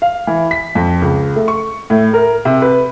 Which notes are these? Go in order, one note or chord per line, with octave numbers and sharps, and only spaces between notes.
F5
E3
B6
F2
C#2
A3
C#6
A2
A#4
C3
B4